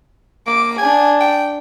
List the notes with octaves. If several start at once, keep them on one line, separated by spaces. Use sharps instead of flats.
A#3 D6
D4 G#4 G#5
G5